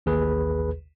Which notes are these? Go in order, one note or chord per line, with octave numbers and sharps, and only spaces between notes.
A1 D#2 G#4 B4